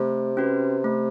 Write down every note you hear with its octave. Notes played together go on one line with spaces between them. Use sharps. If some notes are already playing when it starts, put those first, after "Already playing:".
Already playing: C3 A3
C#4 F#4 B4
A3